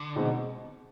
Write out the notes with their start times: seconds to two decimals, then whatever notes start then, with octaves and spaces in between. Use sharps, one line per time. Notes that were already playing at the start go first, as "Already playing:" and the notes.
Already playing: D3
0.15 B2 G#3 C4 D#4